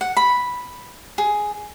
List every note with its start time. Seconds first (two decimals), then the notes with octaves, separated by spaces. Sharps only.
0.01 F#5
0.17 B5
1.18 G#4